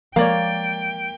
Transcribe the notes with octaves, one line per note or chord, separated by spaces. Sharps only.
F3 G#3 A#3 C#5 D5 F5 G5